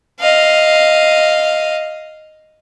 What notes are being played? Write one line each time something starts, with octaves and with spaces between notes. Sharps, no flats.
D#5 F5